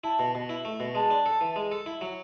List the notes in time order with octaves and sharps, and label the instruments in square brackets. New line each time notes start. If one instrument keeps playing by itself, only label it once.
[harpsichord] E4 [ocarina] A5
[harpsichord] B2
B2
E4
A3
B2
[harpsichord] G#3 [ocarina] A5
[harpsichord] D4
A4
E3
G#3
A4
E4
F#3